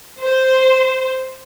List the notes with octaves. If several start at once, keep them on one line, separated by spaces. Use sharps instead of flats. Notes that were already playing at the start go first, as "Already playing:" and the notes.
C5